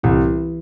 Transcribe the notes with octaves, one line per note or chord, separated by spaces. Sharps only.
C2 E3 E4